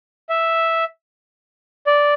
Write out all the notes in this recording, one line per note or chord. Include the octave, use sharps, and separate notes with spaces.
E5
D5